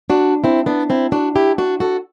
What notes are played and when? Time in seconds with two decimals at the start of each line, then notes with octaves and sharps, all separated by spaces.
0.10 D4 F#4
0.44 C4 E4
0.66 B3 D4
0.90 C4 E4
1.12 D4 F#4
1.36 E4 G4
1.58 D4 F#4
1.80 F#4 A4